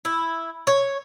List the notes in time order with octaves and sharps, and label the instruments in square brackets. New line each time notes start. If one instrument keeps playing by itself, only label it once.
[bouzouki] E4
C#5